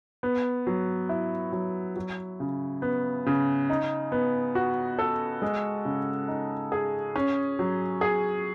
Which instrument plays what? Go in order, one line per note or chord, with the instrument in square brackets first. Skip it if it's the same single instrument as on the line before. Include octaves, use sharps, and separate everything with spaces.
[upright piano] B3
F#3
E4
F#3
F#3
C#3
B3
C#3
D#4
B3
F#4
A4
G#3
C#3
D#4
G#4
C#4
F#3
G#4